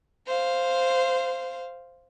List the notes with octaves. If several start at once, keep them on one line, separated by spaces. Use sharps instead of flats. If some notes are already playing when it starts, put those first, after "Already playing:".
C5 F5